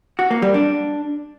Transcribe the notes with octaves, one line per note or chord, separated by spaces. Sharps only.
F#4
A#3
G3
D4